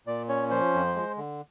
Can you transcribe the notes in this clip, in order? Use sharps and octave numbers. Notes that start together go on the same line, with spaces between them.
A#2 D5
C#4 C#5
F3 C5
F2
G#3
D3